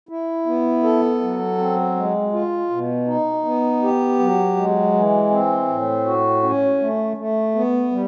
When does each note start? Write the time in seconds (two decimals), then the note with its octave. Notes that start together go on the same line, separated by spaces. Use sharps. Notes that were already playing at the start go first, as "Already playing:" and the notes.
0.09 E4
0.46 B3
0.83 A4
1.21 F#3
1.58 C4
1.96 G#3
2.33 F4
2.70 B2
3.07 D#4
3.44 B3
3.82 G4
4.19 F#3
4.56 G#3
4.93 E3
5.31 C4
5.68 A2
6.06 F#4
6.43 C#4
6.80 A3
7.17 A3
7.55 B3
7.92 G3